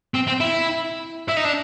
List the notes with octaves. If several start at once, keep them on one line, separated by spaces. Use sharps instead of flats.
C4
C4
E4
E4
D#4
D4